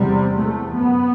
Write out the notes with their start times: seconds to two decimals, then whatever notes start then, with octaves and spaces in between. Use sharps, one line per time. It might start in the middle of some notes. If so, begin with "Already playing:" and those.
Already playing: E2 C3 G3
0.35 A3
0.75 F#2 B3